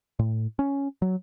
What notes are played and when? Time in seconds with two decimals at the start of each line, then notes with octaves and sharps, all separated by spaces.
0.19 A2
0.59 C#4
1.02 F#3